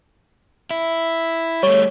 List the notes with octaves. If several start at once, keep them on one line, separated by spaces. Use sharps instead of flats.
E4
G3 A3 C#5